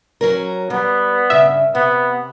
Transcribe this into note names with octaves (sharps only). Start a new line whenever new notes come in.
F#3 C#4 A#4
G3 B3
G2 C#3 E5
C3 B3